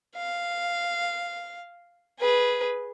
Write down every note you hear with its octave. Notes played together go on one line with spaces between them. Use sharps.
F5
G#4 B4